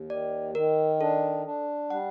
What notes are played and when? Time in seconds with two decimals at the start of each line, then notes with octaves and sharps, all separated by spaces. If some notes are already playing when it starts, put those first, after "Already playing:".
Already playing: D#2
0.10 D#3 D5
0.55 D#3 A#4
1.01 D4 A4
1.46 D4
1.90 G3 F#5